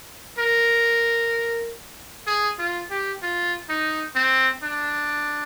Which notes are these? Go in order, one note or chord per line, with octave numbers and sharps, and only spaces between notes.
A#4
G#4
F4
G4
F4
D#4
C4
D4